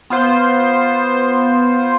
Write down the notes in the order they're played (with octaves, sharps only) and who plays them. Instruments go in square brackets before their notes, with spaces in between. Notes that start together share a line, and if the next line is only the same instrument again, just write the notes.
[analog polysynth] B3 F4 C5